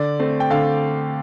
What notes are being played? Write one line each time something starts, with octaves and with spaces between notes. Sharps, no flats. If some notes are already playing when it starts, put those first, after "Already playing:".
Already playing: D3 D5
A3 C4
G5
D3 F5